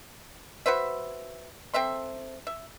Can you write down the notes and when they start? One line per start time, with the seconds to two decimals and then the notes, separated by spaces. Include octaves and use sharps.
0.66 F#4 B4 C5 E5
1.74 C4 A4 E5 C6
2.47 E5